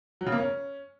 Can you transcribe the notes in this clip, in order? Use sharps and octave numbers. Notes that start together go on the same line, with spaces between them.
F#3
C#3
A#3
C#4